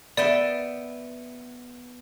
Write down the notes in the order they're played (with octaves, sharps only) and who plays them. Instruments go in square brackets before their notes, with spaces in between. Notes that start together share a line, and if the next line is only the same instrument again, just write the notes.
[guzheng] B3 E5 G5 [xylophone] D5